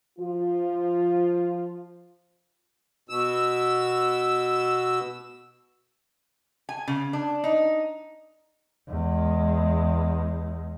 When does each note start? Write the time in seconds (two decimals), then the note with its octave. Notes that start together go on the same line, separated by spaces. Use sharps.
0.19 F3 F4
3.09 B2 E6
6.69 G#5
6.88 C#3
7.13 D4
7.44 D#4
8.89 E2 G#3